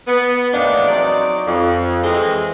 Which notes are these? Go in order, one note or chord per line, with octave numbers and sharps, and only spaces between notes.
B3
E2 A2 F3 A#3 D4 D#4
F#3 C4 D#4 D5
F2
E3 G#3 C4